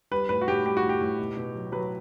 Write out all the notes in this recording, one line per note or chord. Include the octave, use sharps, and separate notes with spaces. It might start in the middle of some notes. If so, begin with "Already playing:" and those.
G3 B4
A2 B4
F#4
A2 G4
G3 G4
F#4
A2
G4
A2
B2
B2
F#3
F#3 B4